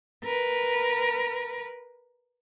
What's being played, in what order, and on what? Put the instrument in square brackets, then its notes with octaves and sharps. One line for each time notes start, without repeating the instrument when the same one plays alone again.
[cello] A#4 B4